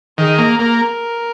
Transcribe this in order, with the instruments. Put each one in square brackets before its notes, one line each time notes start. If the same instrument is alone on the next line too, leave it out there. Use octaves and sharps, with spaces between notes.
[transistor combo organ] D#3 [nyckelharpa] G#4
[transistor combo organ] A#3
[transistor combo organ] A#3 [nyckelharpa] A#4